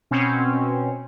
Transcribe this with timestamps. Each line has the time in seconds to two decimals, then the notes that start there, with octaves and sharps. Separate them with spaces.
0.11 B2 C4 C#4